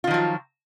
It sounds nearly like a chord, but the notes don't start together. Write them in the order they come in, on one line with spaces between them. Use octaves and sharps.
F4 D#3 F3 F#3